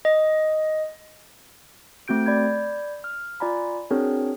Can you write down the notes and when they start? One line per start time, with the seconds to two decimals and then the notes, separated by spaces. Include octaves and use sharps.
0.05 D#5
2.08 A3 C4 F#4 G6 D7
2.26 D5 B5 G6 G#6
3.04 F6
3.40 F4 D5 G#5 A#5 B5
3.90 C4 D4 F#4 G#4 A#4 C#5